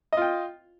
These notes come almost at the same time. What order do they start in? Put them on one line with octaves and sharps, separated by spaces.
D#5 F4 G5